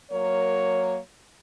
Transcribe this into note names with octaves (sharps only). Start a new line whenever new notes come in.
F#3 A#3 A#4 C#5